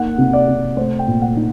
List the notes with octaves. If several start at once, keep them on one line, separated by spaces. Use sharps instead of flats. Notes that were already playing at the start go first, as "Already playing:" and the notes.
Already playing: A#3 D#4 F#5
C3
D5
C3
A3 C5
G5
A#2
F#5
D#4